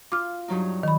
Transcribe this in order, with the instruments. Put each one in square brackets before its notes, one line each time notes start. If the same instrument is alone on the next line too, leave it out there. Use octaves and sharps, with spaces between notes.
[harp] F4 [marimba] D6 F6
[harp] G2 F#3 D#4
[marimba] D#3 B5